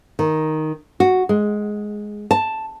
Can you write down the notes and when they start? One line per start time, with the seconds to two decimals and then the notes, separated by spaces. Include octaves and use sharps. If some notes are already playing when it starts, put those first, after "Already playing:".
0.19 D#3
1.00 F#4
1.29 G#3
2.31 A5